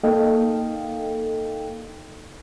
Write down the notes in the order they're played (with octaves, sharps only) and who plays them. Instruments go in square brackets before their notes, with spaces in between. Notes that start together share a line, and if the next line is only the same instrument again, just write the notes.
[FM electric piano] A#3 D#4 A4 D#5 F5 G5